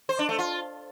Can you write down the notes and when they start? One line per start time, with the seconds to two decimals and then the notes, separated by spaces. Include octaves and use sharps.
0.09 C5
0.19 D4
0.29 A3
0.39 F4